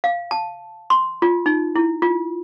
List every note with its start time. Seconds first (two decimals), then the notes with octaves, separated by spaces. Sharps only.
0.04 F5
0.31 A5
0.90 C6
1.22 F4
1.46 D#4
1.75 E4
2.02 F4